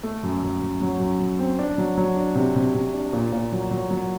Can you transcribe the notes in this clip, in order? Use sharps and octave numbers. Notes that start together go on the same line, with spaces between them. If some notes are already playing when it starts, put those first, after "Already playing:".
A3
F#2
F#2
F#2
F#3
F#2
F#3
C4
D4
F#3
F#3
D4
C3
C3
C3
D4
A#2
A#2
F#3
F#3
F#3